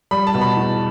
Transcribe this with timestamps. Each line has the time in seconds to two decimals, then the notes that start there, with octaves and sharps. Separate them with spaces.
0.11 G3 B5
0.27 A5
0.34 B2
0.41 B5
0.57 E2